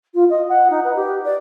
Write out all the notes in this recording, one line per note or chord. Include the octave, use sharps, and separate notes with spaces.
F4
D#5
F#5
D#4
B4
G4
D5